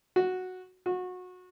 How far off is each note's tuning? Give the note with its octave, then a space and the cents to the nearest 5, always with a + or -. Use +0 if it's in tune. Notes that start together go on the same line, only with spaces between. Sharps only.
F#4 -5
F#4 -25